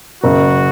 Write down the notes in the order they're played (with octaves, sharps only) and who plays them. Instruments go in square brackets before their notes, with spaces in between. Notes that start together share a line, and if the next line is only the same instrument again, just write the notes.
[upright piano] F#1 [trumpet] F#4